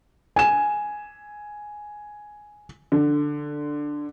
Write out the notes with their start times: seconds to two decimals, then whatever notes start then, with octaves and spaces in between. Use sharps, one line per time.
0.36 G#5 E7
2.92 D3